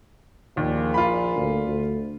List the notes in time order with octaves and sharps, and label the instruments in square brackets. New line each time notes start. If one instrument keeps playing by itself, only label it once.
[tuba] A#1 [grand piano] D#2 [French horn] A#2
[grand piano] F4 B5
[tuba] D2
D2